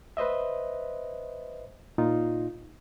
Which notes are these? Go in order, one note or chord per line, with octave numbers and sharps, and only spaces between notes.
B4 C5 D#5 E5
A#2 D#4 F4